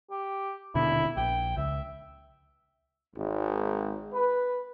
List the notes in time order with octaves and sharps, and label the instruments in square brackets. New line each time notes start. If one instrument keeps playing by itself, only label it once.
[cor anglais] G4
[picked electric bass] D#1 B2 D3 [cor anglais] E4
[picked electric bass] A#1 [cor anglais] G5
[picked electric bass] C#2 [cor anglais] E5
[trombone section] G#1
B4